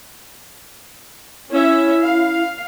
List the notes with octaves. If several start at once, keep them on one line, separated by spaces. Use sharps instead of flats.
C#4 E4 E5
F5